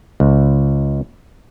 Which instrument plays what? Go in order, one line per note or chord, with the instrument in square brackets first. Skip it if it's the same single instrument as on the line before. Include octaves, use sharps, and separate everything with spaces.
[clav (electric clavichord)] C#2